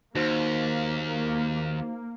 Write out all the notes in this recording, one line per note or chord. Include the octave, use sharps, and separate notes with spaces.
D#2 A#3 D#4 F#4 C5